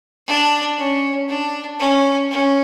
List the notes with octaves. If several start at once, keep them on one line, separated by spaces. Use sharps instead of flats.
D4
C#4
D4
C#4
C#4